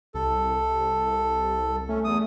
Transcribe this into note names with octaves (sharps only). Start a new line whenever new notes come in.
C2 A4
A3 C#4
E2 D#6